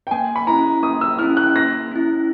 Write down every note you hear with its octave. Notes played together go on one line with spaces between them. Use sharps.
G5
A#3 G#5
B5
C#4 E4 A#5
A#3 D#6
E6
C#4 E4 F6
F#6
A#3 A#6
C#4 E4